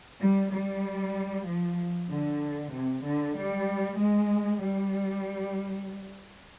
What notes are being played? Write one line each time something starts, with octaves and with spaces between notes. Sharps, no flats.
G3
G3
F3
D3
C3
D3
G3
G#3
G3